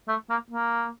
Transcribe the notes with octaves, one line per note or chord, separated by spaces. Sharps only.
A3
A#3
A#3